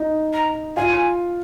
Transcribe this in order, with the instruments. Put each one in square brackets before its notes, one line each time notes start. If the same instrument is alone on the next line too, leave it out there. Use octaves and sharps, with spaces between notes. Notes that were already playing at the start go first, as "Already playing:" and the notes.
Already playing: [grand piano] D#4
[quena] A#5
[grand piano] F4 [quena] G#5